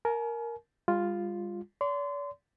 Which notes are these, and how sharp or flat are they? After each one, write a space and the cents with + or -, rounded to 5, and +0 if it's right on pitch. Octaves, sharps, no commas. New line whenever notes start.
A#4 +0 G#5 +40
G3 +45 F4 +0
D5 -45 C6 -30